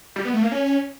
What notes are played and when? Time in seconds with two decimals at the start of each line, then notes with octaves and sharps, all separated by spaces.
0.16 G3
0.25 B3
0.34 A3
0.43 A#3
0.51 C#4